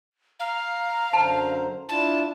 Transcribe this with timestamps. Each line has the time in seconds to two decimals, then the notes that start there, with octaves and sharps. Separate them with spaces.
0.40 F5 A#5
1.13 F#2 D3 C5 A5
1.89 D4 E4 F4 A5